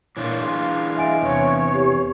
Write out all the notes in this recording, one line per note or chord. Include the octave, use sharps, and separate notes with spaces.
A#2 E3 D4 F4 C#5
G#4 F5 C6
D#5 E5 G#5 D7
E2 C3 B3 C#5
G4